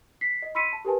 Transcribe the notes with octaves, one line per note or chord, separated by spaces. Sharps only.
B6 C7
D#5
B5 C6 E6 B6 C#7 D#7
A5
G4 A#4 B4 G#5 A5